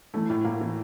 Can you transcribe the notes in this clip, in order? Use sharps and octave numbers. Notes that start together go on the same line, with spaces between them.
E3 A3
A2
A2 A#3
E3